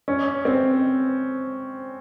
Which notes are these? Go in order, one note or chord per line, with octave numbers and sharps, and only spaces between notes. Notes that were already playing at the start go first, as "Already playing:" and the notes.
C#4
C4